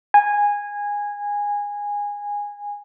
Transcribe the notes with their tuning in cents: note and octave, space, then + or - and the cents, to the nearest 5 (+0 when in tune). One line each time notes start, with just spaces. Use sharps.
G#5 -15